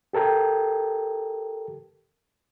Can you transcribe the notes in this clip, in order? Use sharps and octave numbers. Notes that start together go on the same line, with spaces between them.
G4 A4 A#4 G5